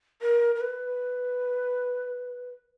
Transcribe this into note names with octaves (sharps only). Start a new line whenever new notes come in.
A#4
A#4
B4